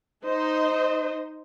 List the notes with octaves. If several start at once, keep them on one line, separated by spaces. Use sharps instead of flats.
D#4 C5 D#5